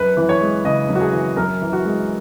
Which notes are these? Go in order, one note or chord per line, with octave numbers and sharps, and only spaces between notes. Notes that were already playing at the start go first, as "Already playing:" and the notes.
Already playing: F#2 B4
E3
C#5
G#3
C#3 D#5
F#2
F#4
G#4
E3
F#2 A#4
E3
F#4
G#3